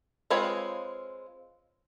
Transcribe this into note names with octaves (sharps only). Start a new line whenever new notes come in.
G#3 C4 F4 B4 C#5